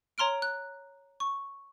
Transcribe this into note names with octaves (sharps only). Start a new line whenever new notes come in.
C#5 A#5 C6 F6 D7
F#6
C#6